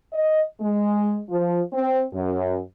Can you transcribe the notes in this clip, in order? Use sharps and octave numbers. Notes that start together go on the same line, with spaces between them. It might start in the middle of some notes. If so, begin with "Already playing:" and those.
D#5
G#3
F3
C4
F#2